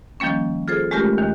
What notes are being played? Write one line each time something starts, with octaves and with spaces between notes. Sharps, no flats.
D#3 F3 G3 A#3 C#4
F4 G#4 A4 C5
G#3 A3 C#4 F4 G4 A#4
D#2 D#3